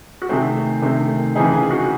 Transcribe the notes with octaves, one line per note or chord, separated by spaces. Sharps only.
F#4
C3 D#3 A3 C4 G#4
C3 D#3 A3 C4
C#3 E3 C4 D#4 G#4
G#4
F#4